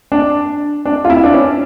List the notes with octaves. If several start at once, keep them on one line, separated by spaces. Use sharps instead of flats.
D4
D4
F4
E4
D4
C#4